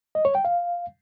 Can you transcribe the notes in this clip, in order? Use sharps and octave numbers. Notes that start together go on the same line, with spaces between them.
D#5
C#5
G5
F5